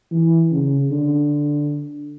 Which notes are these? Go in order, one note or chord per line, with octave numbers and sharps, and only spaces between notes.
E3
C#3
D3